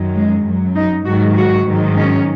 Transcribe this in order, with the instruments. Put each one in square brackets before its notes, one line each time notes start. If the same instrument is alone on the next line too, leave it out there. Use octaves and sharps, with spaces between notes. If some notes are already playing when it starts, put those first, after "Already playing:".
Already playing: [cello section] F#2 D#3 F#3
G#3
F#2 F#3
D#4
G#2 D#3 F#3 F#4
F#4
G#2 D#3 F#3
C#4